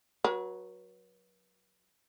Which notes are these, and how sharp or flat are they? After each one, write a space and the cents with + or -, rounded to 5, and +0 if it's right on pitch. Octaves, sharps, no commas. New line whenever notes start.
F#3 -5 B4 -40